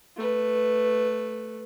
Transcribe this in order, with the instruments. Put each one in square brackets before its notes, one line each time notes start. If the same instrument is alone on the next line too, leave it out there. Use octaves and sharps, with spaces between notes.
[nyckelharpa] A3 B4